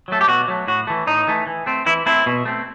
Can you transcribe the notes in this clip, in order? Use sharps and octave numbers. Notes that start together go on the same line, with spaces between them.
F#3 A3 A4
G4
B2 F#4
F#3 A3
A2 F#4
E3 A3
A2 D#4
E3 A3
E3
A3 C4
E3 E4
A3 C4 E4
B2
A3 C4